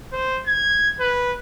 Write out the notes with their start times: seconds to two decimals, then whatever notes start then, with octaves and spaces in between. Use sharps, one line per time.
0.13 C5
0.46 G#6
1.00 B4